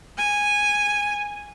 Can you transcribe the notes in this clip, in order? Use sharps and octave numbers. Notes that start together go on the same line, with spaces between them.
G#5